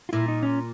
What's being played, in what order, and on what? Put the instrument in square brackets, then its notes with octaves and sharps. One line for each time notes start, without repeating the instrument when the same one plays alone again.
[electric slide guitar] F4
[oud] A#2 [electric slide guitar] E4
[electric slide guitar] D#4
C#4